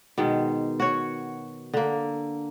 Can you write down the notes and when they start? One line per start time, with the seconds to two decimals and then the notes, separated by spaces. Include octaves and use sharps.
0.18 B2 D#3 G#3
0.80 F#4 C#5
1.74 D3 A#3